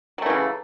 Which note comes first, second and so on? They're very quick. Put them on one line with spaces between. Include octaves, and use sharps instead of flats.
F#3 A3 E3 C#3